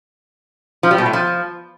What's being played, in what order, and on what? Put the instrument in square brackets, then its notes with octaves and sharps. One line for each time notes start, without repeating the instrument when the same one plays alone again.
[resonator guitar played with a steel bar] F3
G3
B2
A2
F3